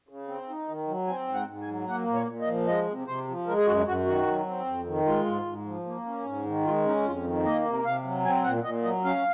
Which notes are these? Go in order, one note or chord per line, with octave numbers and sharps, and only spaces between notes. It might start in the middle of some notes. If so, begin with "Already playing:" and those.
C#3
C4
D#4
D#3
F#3
C4 G#5
G#2
F#5
G#2
G#5
F#3
A#3 F#5
A#2
C#5
A#2
D#5
F3
G#3 D#5
C3
C3 C5
F3
G#3 A#4
G#4
F#2 F#4
F#2 F#4
D#3 F#4
F#3
C4
F2
D#3
G#3 F4
G#2
G#2
F3
A#3
C#4
G#2
D#3
G#3 F4
C#4 D#4
F2 F4
D#3
A#3 D#5
C3
C3 F5
F#3
C4 G#5
A#2 F#5
A#2 D#5
F#3 D#5
C#4 F5